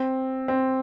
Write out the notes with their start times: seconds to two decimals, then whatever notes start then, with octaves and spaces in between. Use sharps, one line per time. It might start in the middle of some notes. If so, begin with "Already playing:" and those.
Already playing: C4
0.48 C4